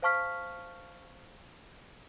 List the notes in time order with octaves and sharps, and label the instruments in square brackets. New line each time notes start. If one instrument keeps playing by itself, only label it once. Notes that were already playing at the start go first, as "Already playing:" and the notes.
[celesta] C5 F5 A5 C#6 F6 B6